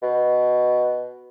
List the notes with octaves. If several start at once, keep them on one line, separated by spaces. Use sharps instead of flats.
B2